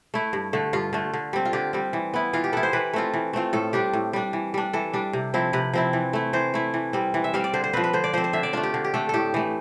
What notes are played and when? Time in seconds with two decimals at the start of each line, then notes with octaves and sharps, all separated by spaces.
0.14 A3 E4
0.33 G2
0.53 D3 A3
0.73 G2 F4
0.93 D3 A3
1.13 D3
1.33 G3 C4
1.45 F4
1.53 D3 G4
1.73 G3 C4
1.93 E3
2.14 B3 E4
2.33 E3 F4
2.44 G4
2.53 B3 E4 A4
2.63 C5
2.73 E3 B4
2.93 A3 C4 F4
3.14 E3
3.33 A3 C4 F4
3.53 A2 A4
3.73 G3 D4 G4
3.93 A2
4.13 G3 D4
4.33 E3
4.54 G3 D4
4.73 E3 A4
4.93 G3 D4
5.13 C3
5.34 F3 C4 E4
5.53 C3 B4
5.73 F3 C4 E4
5.93 E3
6.13 A3 E4
6.33 E3 C5
6.54 A3 E4
6.74 E3
6.93 G3 C4
7.14 E3
7.24 E5
7.34 G3 C4 F5
7.44 D5
7.54 D3 C5
7.64 C5
7.73 F3 C4 B4
7.84 B4
7.93 D3 C5
8.04 D5
8.13 F3 C4 C5
8.24 C5
8.33 D3 E5
8.43 D5
8.53 A3 D4 F4
8.63 G4
8.74 D3
8.84 G4
8.94 A3 D4 A4
9.09 A2 G4 A4
9.34 E3 A3